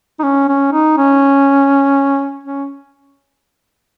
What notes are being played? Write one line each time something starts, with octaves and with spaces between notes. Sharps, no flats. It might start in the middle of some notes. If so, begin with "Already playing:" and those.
D#4
C#4
C#4
D#4
C#4
C#4